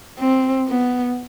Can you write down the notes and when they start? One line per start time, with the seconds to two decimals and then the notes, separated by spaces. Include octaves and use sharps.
0.19 C4
0.68 B3